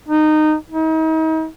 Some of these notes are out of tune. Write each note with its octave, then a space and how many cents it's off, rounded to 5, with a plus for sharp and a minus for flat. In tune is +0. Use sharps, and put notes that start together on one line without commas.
D#4 -15
D#4 +40